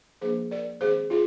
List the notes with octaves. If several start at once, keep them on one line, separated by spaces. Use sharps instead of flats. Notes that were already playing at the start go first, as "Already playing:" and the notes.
F3 A#3 D4 G#4 C5
A#4 D5
D#3 G#3 C4 G#4 C5
F4 G#4